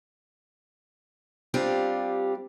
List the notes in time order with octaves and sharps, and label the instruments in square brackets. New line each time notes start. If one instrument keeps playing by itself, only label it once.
[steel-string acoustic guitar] G3 C4 D4 F4 G4